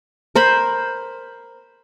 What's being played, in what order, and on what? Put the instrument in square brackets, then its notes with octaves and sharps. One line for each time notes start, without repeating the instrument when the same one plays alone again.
[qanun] A#4 C5 B5